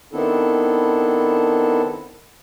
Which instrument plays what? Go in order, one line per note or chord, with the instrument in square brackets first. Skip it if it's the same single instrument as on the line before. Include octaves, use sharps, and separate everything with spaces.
[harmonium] D#3 B3 C4 D4 E4 A4